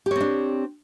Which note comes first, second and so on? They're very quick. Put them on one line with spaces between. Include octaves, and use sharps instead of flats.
G4 C#5 C4 D4